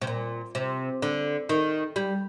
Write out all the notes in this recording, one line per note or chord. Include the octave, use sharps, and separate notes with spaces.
C3
A#2
C3
D3
D#3
G3